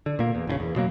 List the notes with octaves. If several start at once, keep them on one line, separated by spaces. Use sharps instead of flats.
D3
A#2 A#3
E2
F1 G#2 C#3
E2
B2 F#3 A#3